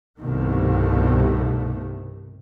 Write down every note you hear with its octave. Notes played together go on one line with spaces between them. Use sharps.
C2 G2 B2 D#3 A3